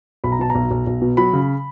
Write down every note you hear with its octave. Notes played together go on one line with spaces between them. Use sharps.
B1 B5
A#5
B2 A5
A#5
B1
B1
B1
B2
F#3 B5
C#3